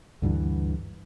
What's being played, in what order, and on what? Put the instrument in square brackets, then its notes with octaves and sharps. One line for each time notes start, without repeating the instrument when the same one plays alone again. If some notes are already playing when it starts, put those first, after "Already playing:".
[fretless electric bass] D2 G2 D3 E3